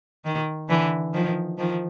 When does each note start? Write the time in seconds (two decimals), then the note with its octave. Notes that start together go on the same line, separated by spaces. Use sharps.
0.25 D#3
0.69 D3 E3
1.14 D#3 F3
1.58 D#3 F3